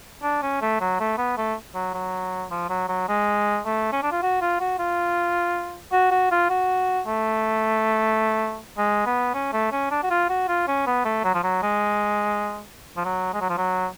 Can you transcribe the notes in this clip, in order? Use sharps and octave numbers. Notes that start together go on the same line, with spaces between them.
D4
C#4
A3
F#3
A3
B3
A3
F#3
F#3
F3
F#3
F#3
G#3
A3
C#4
D4
F4
F#4
F4
F#4
F4
F#4
F#4
F4
F#4
A3
G#3
B3
C#4
A3
C#4
D4
F#4
F4
F#4
F4
C#4
B3
A3
F#3
F3
F#3
G#3
F3
F#3
G#3
F#3
F3
F#3